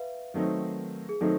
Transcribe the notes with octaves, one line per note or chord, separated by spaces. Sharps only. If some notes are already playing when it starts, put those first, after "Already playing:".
Already playing: B4 E5 F5
D#3 F#3 A3 C4 D#4 A#4
G#4
D#3 F#3 A3 C4 D#4 A4